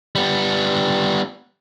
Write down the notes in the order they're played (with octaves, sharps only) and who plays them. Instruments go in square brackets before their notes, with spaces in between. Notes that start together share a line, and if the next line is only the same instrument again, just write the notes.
[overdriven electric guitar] G3 B3